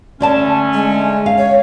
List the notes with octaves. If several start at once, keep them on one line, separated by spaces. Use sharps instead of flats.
D3 A3 C#4 D5 A5
G#3
F5
C#5